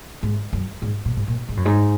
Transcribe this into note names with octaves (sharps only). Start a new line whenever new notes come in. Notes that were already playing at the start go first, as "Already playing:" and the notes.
G#2
F#2
G#2
A#2
G#2
A#2
G#2
F#2
G#2